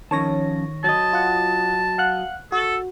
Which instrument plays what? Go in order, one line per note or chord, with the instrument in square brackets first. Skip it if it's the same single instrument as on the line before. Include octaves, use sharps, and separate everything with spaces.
[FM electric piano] D#3 C#5 A#6 [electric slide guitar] F3 C#4 A5
[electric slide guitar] F#3 D#5 [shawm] A5
[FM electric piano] F4 F#5
F5 F#5 F#6
[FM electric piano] F#4 [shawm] A4